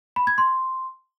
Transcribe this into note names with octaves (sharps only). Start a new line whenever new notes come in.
B5
G#6
C6